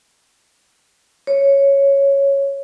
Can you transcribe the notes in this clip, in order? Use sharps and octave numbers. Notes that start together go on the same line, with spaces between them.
C#5